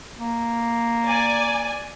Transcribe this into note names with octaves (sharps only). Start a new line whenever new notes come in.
A#3
D5 G#5